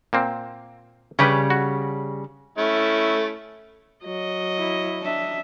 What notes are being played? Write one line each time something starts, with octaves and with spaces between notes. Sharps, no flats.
A#2 A#3 C4
C#3 G3 C#4 G4 B4
F#4
A3 C#4 E4
F#3 D#5
E4
D4 E5